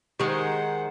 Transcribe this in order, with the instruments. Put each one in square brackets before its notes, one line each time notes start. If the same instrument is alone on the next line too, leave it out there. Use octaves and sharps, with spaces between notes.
[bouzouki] D#3 G#3 [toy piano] G4 G5 [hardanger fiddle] C5 F#5